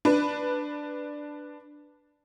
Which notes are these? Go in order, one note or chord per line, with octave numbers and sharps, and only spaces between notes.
D4 B4